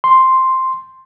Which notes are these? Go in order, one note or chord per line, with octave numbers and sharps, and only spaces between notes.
C6